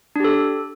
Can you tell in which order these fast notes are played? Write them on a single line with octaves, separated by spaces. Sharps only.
D4 G4 A4